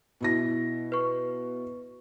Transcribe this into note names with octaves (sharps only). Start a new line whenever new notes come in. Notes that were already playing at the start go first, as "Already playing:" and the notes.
B2 E4 A#6
B4 C#6